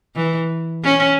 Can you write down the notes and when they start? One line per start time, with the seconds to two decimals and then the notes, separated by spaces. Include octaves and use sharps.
0.15 E3
0.84 C#4